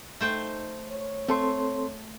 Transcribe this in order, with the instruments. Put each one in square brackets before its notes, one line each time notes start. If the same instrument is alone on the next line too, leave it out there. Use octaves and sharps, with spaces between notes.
[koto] A3 C5 G5 [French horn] D#4
[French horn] C#5
[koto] A3 [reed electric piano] C4 A4 C6